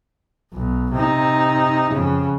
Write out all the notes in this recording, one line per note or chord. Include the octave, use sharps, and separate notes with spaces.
B1
C3 D#4
F2 C#3